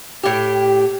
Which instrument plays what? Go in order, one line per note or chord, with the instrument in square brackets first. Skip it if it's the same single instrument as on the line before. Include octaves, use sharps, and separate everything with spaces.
[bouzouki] A2 G4